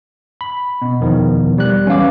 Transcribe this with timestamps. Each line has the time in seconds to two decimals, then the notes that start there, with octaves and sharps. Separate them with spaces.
0.41 B5
0.82 B2
1.00 E2 D#3 F3
1.58 G3 F#6
1.87 G2 E3 C#4 F5 D6